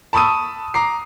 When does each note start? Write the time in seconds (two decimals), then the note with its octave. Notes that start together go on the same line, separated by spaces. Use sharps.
0.13 A5 B5 C#6 D#6 E6 D#7
0.74 A#5 D6 C7